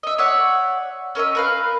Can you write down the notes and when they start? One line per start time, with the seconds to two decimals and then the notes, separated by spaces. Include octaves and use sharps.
0.03 D#5 E5
0.18 C#5 D5 E5 F#5
1.15 C#4 A#4 D#5 E5
1.35 A#4 B4 F5